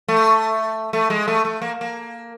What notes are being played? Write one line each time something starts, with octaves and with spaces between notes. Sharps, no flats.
A3
A3
G#3
A3
A3
A#3
A#3